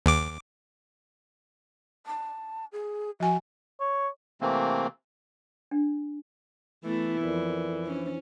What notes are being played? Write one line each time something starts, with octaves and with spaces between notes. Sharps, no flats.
D#2 D6
A5
G#4
F3 F#4 G#5
C#5
C3 E3 A3 A#3 C4
D4
E3 A3 B3 E4
F2 A4 A#4 D5
C#4 D4 E4 C5